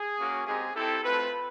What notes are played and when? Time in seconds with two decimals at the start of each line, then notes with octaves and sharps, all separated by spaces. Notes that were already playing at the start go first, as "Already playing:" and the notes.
Already playing: G#4
0.18 A#3 C#4 F#4
0.46 G#3 C4 D#4 G4 G#4
0.75 C4 E4 G4 A4
1.03 A3 C4 F4 B4